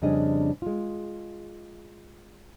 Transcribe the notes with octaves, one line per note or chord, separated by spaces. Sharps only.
F2 C#3 G3 D4 G#4 D#5
G#3 F4